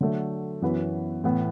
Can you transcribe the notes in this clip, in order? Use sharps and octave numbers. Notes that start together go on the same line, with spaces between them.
D3 F#3 A3
F#2 E3 B3 F#4 B4
A2 E3 B3